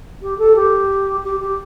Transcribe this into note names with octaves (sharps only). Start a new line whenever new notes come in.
G4
A4
G4
G4
G4